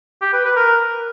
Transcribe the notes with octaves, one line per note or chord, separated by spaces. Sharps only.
G4
B4
B4
A#4